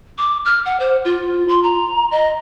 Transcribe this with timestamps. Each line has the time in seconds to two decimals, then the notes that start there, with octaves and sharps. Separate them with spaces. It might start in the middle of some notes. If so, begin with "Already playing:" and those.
0.18 D6
0.45 F6
0.65 F#5
0.80 C5
1.05 F4
1.48 C6
1.63 A#5
2.11 D#5